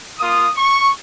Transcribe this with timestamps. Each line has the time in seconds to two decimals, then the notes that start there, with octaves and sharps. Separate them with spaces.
0.18 A#3 F4 D#6
0.56 C#6